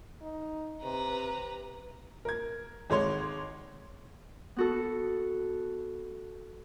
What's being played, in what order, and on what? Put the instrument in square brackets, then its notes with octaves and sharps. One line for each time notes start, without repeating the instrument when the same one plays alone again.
[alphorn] D#4
[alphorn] C3 [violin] B4 A#5
[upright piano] A#4 G#6
G#1 G#3 C#5 C6
[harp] B3 F#4 A4